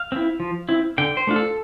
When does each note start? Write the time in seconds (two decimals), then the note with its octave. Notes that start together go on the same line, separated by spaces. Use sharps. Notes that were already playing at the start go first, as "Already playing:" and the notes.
Already playing: F5
0.12 C4 E4
0.40 F3
0.69 C4 E4
0.98 D3 G5
1.17 C5
1.27 A3 D4 F4
1.36 A4